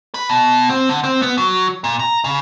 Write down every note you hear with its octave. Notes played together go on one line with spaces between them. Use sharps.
B4
B2
C4
D3
C4
B3
F#3
A#2
A#5
C#3